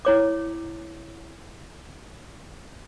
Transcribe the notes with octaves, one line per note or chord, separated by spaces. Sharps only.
E4 C#5 D6